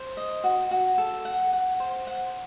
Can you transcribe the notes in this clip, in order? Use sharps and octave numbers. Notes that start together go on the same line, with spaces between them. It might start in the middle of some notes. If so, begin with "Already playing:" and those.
Already playing: C5
D#5
F#4
F#4
A4
F#5
F#5
C5
F#5